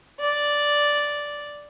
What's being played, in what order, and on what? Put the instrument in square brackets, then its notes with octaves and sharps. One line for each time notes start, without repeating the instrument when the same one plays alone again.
[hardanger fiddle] D5